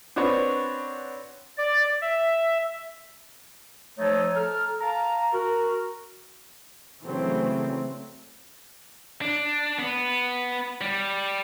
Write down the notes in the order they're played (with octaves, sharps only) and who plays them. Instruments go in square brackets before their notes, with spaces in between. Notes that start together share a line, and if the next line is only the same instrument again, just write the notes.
[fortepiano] C4 D4 F#4 B4 C#5
[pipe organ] D5
E5
[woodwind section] F3 A3 D#4 A4 C#5
A4 A#5 F6
F5 A5 A#5
F#4 A#4
[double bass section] C#3 E3 F#3 A3 C4
[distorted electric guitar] D4
B3
G3